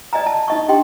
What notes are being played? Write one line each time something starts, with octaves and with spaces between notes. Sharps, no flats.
D5 D#5 G#5 A#5
A5
D#4 D#5 C#6
D4 G4 D#5 G5 C6